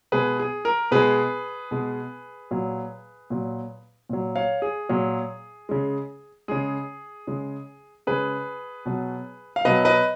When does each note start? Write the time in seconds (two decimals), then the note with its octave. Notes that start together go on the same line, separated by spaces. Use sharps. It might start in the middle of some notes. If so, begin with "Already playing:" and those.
0.12 B2 G#3 G#4 B4
0.39 G#4
0.65 A#4
0.91 B2 G#3 G#4 B4
1.71 B2 G#3
2.51 A#2 F#3
3.30 A#2 F#3
4.09 A#2 F#3
4.36 C#5 F5
4.62 G#4
4.89 A#2 F#3
5.69 C#3 G#3
6.48 C#3 G#3 G#4
7.27 C#3 G#3
8.07 C#3 G#3 G#4 B4
8.86 B2 F#3
9.56 F5
9.65 B2 F#3 B4 D#5
9.85 B4 D#5